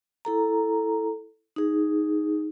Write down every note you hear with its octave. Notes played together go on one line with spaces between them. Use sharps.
E4 A4 A#5
D#4 G#4